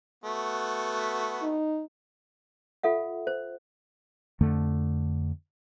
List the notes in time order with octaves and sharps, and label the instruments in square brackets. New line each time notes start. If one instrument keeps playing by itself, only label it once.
[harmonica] A3 B3 F#4
[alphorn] D#4
[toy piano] F4 A4 E5 F#5
C5
[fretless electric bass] F2 D3 A3